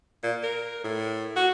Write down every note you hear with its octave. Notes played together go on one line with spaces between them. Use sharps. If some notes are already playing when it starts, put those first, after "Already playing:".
A#2
A#4
A2
F#4